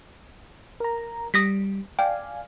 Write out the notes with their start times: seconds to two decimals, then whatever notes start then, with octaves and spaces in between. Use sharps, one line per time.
0.80 A#4 A#5
1.34 G3 D#6 A#6 B6
1.99 D5 F5 G5 G#5